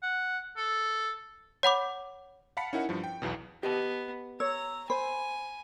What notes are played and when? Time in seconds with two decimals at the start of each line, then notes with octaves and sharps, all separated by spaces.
0.03 F#5
0.57 A4
1.63 C#5 F#5 B5 D6
2.57 F5 F#5 A5 B5 B6 C#7
2.73 C#4 D#4 E4 A#4 F#5
2.89 G2 F3
3.04 G5
3.22 B1 E2 B2
3.63 B3 G4 D#5 A5
4.40 C#5 A#5 E6
4.90 C5 G#5 B5